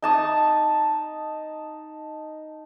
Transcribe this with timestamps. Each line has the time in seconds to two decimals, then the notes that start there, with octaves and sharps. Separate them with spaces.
0.02 D#4 A5 D#6